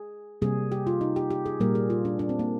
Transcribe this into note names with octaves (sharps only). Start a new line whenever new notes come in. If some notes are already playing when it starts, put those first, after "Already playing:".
Already playing: G#4
C3 G3 A#3 G#4
G4
F4
D#4
G4
G4
G#4
A#2 G3 A#3 A#4
G#4
F4
D4
D4
C4
A#3